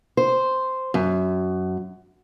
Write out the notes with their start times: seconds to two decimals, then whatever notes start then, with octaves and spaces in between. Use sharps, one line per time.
0.17 C5
0.94 F#2